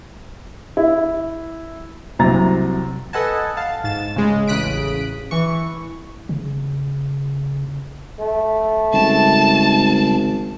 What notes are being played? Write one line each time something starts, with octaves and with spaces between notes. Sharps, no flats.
E4
C2 C3 F#3 A#5 A6
A4 B4 D#5 F#5 G#5 A5
F5 A5
G#2 A6 E7
C#3 G#3
A1 C#3 D#6 F#6 B6 D7
E3 C#6
C#3
A3
G#1 C#3 G3 C#4 A5